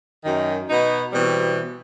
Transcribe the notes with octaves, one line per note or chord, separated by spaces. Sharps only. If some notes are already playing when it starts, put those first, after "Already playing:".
F#2 D#3
B2 B3 D#4
B2 E3 G3 C4